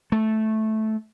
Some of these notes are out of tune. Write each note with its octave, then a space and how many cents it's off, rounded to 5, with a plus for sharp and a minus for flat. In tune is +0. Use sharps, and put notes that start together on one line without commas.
A3 -10